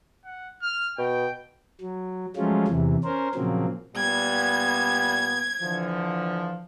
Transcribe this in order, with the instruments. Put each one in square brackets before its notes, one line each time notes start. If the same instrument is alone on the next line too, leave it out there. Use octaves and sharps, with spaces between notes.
[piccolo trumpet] F#5
F6
[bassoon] B2 [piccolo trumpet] G5
[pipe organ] F#3
F3 F#3 G#3 A3 C#4 F4
E2 C3 E3
C#4 A#4 C5
A#2 C#3 F3 F#3 A#3 C4
[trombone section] A#2 G3 B3 [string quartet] G#6
[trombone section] D3 E3 F3